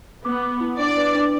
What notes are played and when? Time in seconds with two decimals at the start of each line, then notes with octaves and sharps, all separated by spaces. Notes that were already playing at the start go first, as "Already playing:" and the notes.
0.25 B3 D6
0.43 D6
0.61 E4
0.79 D4 D5
0.97 B4
1.15 D4